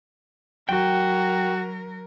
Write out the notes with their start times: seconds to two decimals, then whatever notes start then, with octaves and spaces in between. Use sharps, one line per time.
0.69 F#3 F#4 A#4 G5